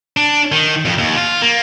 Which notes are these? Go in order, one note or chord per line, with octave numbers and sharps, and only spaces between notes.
D4
D#3
F2
D#2
F4
A#3